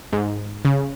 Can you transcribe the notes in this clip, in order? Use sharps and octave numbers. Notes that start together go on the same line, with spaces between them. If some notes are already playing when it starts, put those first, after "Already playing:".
G#2
C#3